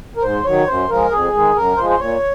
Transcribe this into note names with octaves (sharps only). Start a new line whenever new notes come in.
A#4
G#2 C5
D#3 F#3 C#5
F#2 C5
F3 G#3 A#4
F2 G#4
D#3 G#3
F#2 A#4
F3 G#3 C5
C5
A#2 C#5